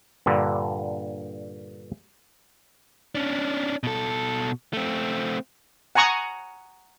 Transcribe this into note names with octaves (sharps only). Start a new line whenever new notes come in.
G2 A#2 D3
C#4 D4
B2 A4
A3 C4
F#5 G#5 A#5 C#6 D#6